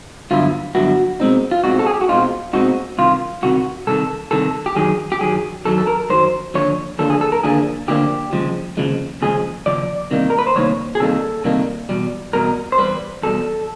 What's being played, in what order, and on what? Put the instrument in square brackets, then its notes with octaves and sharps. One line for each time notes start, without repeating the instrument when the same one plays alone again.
[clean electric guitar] G2 D3 F#3 B3 E4 F4
G2 D3 F#3 B3 E4 F#4
B2 G#3 C4 D#4
F4
B2 G#3 C4 D#4 F#4
A4
G#4
G4
F#4
B2 G#3 C4 D#4 F4
B2 G#3 C4 D#4 F#4
C2 C3 D#3 F4
C2 C3 D#3 F#4
C2 C3 D#3 A4
C2 C3 D#3 A4
G4
F#2 D#3 F#3 G#4
G4
F#2 D#3 F#3 G#4
F#2 D#3 F#3 A4
A4
A#4
F#2 D#3 F#3 C5
D#2 D3 F3 D4 C#5
D#2 D3 F3 A#3 D4 A4
G#4
A4
A#4
D#2 D3 F3 A#3 D4 G#4
D#2 D3 F3 A#3 D4 G4
D#2 C#3 F3 G#3
D#2 C#3 F3 G#3
D#2 C#3 F3 G#3 G#4
D#2 C#3 F3 D5
C3 D#3 G3 A#3 D#4
A#4
B4
C5
C3 D#3 G3 A#3 D#4 C#5
G#4
C3 D#3 G3 A#3 D#4 A4
C3 D#3 G3 A#3 D#4
E2 B2 G3
E2 B2 G3 A#4
C5
E2 B2 G3 B4
E2 B2 G3 A4